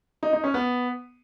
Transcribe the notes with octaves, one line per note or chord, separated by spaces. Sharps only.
D#4
D#4
C#4
B3